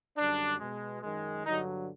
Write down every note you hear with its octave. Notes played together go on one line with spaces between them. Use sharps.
F#2 D3 G3 D4
B2 G#3
F#2 D#3 G#3
G2 D3 F#3 D#4